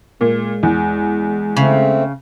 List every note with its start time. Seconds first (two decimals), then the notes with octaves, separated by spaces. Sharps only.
0.21 A#2 G#3
0.63 E2
1.57 C#3 A3 C4